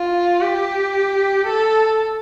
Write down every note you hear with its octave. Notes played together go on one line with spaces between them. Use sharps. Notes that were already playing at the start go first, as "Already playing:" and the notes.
Already playing: F4
G4
A4